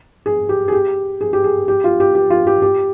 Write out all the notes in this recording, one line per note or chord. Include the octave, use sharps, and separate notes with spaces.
G#4
G4
G#4
G4
G#4
G4
G#4
G4
F4
G4
G4
F4
G4
G4